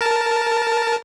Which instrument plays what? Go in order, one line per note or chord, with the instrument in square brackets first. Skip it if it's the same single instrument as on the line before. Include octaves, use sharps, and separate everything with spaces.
[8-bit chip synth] A#4 A5